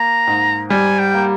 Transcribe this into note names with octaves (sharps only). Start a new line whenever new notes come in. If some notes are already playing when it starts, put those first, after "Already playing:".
Already playing: A#3 A#5
G#2
G3 G#5
G5
A#3